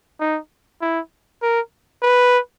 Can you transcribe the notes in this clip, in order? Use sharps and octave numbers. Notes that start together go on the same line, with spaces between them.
D#4
E4
A#4
B4